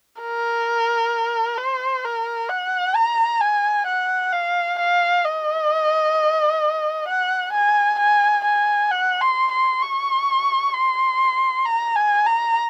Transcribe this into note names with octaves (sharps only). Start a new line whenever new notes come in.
A#4
C5
A#4
F#5
A#5
G#5
F#5
F5
F5
D#5
F#5
G#5
G#5
G#5
F#5
C6
C6
C#6
C6
A#5
G#5
A#5